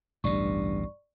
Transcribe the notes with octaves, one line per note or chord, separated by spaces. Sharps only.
A1 D2 G2 B2 D5 C#6